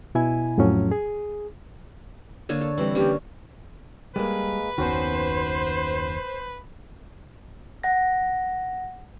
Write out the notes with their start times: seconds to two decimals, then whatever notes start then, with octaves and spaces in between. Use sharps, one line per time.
0.15 B2 E4 G#5
0.58 F2 A2 F3 F#3 C#4
0.92 G#4
2.49 D3 A#3 C#5
2.61 A4
2.78 E3 G3 C4
2.95 D3 A#3 C#4 G4
4.16 G3 G#3 A#3 B4
4.78 F#1 D#2 D#3 B3 C#4 F#4 C5
7.83 F#5 A#6